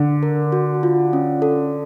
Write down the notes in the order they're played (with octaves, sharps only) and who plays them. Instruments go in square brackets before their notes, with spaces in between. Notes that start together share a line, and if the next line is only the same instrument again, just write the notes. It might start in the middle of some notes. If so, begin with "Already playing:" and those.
Already playing: [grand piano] D3
[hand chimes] A#4
F#4
F4
C#4
A4